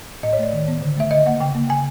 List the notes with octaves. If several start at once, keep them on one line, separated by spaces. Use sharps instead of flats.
A2 D#5
C#5
A3 D5
D#3
B3
D3
A3 E5
D3 D#5
A#3 F#5
C#3 G5
A#3
C#3 G#5